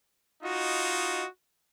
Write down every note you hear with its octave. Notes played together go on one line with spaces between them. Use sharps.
D#4 F4 F#4 D#5